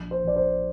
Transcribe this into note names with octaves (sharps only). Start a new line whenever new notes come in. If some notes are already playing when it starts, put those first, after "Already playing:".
Already playing: A#1
C5
A#1 D5
C5